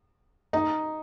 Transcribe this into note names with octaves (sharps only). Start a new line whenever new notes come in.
D#4